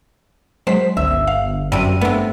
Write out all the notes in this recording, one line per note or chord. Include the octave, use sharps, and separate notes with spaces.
F#3 G#3 C5 B6
G1 C#2 E5
F5
F#2 C3 G3 D#7
G2 C3 A3 B3